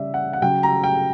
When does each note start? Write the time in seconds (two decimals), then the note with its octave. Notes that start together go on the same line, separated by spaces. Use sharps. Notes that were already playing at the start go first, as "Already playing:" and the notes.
Already playing: C#3 G3 D5 E5
0.14 F#5
0.33 F#5
0.42 C#3 F#3 G5
0.63 A#5
0.84 G5